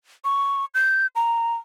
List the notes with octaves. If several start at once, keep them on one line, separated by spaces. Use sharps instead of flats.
C#6
G6
A#5